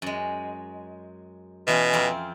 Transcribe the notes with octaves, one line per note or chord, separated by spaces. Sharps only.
F#2 G#3
B2 E3 C#4 F4
F2 C4 F4